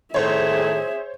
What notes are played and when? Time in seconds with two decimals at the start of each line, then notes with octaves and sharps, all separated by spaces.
0.14 A2 D#3 G#4 C5 C#5 E5